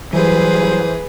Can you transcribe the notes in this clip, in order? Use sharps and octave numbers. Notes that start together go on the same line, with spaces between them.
E3 F#3 G3 G#4 B4 C5